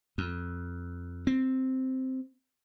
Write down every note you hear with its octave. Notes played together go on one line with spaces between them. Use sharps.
F2
C4